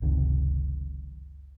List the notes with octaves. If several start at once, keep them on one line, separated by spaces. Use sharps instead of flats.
F#1 C#2 C3 D#3